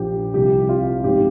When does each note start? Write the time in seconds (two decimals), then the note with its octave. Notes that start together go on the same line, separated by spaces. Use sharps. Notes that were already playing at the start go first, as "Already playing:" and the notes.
Already playing: A#1 A#2 F3 G4
0.34 C2 C3 F3 G4
0.69 F4
1.04 G#1 G#2 F3 G4